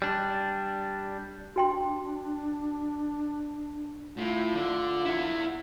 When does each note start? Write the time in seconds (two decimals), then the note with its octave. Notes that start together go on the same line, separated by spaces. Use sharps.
0.02 G3 D4
1.56 D4 F#4 G5 C6
4.18 A2 F4
4.55 D3
5.05 E4 F#5